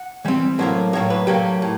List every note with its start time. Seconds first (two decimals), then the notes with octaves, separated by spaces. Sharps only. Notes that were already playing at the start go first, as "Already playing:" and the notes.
Already playing: F#5
0.25 E3 G3 C4
0.59 A2 F#3 A#3 C5
0.93 A2 F#3 A#3 C#5
1.10 B4
1.27 A2 F#3 A#3 G4
1.62 A2